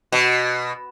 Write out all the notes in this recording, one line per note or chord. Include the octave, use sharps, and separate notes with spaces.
B2